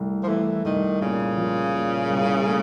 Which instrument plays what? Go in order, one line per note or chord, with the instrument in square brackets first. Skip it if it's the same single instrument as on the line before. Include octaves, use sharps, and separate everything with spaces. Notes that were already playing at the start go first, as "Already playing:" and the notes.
Already playing: [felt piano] C2 A3
[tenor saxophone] F3
[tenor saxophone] E3 [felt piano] A3
[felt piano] C2 [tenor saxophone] D#3
[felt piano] A#2 [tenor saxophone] C#3
[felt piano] F3
A#2
C2
A3